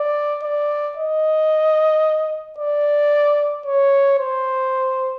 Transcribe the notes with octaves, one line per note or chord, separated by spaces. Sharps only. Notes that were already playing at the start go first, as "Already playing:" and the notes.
Already playing: D5
D5
D#5
D5
C#5
C5